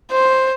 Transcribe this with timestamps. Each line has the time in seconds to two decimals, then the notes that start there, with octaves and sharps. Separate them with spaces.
0.11 C5